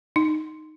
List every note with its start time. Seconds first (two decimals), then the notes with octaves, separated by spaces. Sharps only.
0.16 D#4